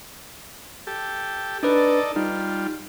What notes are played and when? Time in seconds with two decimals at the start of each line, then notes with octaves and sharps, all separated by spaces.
0.87 G4 A4
1.63 D4 D#4 A4 B4 D5
2.16 G3 D#4 F4